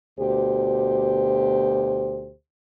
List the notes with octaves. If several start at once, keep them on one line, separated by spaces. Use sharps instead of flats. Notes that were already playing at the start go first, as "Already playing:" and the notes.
D2 B2 G4 C5